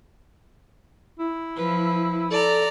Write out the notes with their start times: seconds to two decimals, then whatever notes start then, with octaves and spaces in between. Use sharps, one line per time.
1.19 E4
1.56 F3 B4
2.31 A4 D5 A#5